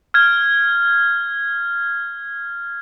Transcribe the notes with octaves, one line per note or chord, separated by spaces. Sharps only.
F6 G#6